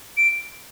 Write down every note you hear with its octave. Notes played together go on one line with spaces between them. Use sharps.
D7